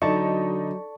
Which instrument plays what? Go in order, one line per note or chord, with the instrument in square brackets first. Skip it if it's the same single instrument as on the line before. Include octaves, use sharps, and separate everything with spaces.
[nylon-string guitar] D3 [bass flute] F#3 [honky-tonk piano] D#4 [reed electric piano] D5 A5 C#6